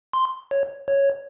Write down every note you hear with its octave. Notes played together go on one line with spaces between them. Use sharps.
C6
C#5
C#5